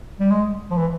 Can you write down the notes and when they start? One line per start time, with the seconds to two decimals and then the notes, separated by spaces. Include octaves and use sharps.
0.20 G3
0.30 G#3
0.71 F3
0.78 E3